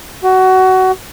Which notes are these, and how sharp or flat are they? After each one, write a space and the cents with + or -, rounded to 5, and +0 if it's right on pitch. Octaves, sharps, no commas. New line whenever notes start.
F#4 +20